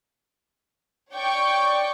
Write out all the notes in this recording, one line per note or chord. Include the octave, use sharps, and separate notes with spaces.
C#5 D5 G5 C#6 D6